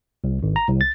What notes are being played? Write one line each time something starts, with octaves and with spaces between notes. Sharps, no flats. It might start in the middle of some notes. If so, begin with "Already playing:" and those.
C2
G#1
A#5
C2
A6